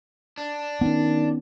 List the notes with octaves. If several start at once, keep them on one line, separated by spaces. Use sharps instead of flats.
D4
D#3 B3 C#4